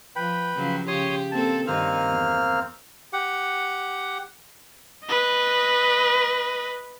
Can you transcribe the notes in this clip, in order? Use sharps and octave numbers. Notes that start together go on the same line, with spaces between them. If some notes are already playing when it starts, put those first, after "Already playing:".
F3 B4 G5 B5
C#3 F3 F#3
C#3 G4 C#5 C6 D#6
A#3 C4 A4 A5
G2 D#3 A#3 C4 D#4 F6
E2
G4 F#5
B4 D#5